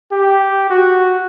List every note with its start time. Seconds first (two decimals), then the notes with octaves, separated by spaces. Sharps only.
0.12 G4
0.70 F#4